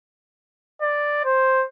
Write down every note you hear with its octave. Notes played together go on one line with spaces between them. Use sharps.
D5
C5